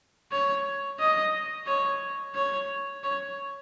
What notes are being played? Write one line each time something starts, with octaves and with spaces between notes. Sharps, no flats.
C#5
D#5
C#5
C#5
C#5